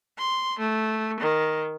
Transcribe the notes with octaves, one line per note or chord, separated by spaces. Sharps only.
C6
A3
D#3